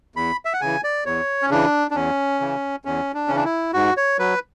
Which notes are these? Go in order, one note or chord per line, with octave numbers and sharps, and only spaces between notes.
E2 B5
E5
F#5
C#3 E3 G#5
D5
E2 C#5
C#4
C#3 E3 D4
D4
E2 C#4
C#3 E3
E2 C#4
D4
C#3 E3 C#4
D4
E4
G#2 F#4
C#5
F#3 B4